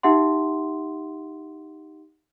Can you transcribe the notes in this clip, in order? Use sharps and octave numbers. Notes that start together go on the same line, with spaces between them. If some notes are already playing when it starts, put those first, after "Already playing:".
D#4 G4 E5 F#5 C6